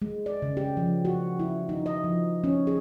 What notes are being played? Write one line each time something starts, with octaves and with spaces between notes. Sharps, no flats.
G#3
D5
C#3
G4
F3
F#4
E4
D#4
D#5
F3
C#4
G#4